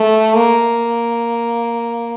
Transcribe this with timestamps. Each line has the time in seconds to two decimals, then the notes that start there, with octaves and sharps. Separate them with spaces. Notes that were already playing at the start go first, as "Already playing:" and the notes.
Already playing: A3
0.36 A#3